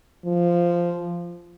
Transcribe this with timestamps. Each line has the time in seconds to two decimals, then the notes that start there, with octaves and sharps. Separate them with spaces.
0.26 F3